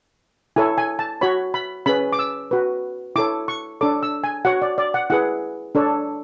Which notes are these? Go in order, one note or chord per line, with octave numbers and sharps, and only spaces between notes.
E4 A4 C#5 G#5
G#5
A5
F#4 C#5 B5
B5
C#4 G#4 B4 B5
D6
E6
F#4 B4
E4 A4 C#5 D6
C#6
D4 A4 C#5 D6
E6
G#5
F#4 C#5 F#5
D5
D5
F#5
E4 G#4 B4 F#5
D4 A4 C#5